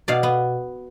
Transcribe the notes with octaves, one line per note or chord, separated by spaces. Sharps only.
B2 D5 F5
B3